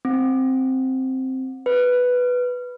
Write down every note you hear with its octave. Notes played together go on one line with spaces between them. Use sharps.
C4
B4